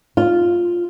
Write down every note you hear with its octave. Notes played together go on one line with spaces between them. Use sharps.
F4